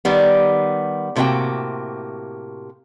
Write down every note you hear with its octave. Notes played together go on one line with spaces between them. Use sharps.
D#3 G3 B3
A2 C3 A#3 E4 F#4 G5